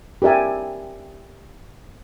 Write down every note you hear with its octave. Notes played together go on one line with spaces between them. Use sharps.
G4 A#4 D5 E5 G#5